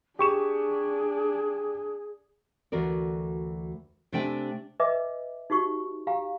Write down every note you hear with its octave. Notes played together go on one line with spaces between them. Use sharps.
D4 G4 G#4 C#6 E7
D2 E3 F#4 A#4 D5
C3 A3 D4 G5 G#5
B4 D#5 E5 G#5 D6
D#4 F#4 G4 C#6
G4 F5 G#5 A#5